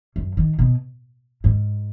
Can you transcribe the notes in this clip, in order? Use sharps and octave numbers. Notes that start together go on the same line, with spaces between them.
F#2
D#3
B2
G#2